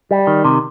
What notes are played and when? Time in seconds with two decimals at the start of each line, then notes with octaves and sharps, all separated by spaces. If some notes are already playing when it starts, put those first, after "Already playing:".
0.11 G3
0.27 D#3
0.45 C3